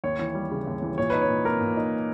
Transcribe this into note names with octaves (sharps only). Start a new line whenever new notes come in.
D#2 C#5
E3
G3
C#3
D#2
E3
A#2 C#5
D#4 B4
C#5
A#2
A#3 A#4
A#2
D#4